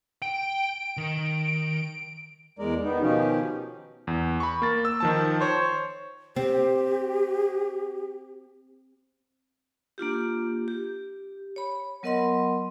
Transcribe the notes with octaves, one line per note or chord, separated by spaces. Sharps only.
G5 D7
D#3
E2 G#3 A#4 D5
D#3 B3 D#4
B2 D#3 F3 C#4 D#4 G4
E2
B5 C#6
A#3 A6
E6
D#3 F3 A5
C5 C#5
C4 G4
A#3 D4 F4 G4
G4
C#5 B5
F#3 B3 A#4 D#5 F#5 C6